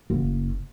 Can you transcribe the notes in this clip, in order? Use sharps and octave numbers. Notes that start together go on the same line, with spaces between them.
F#1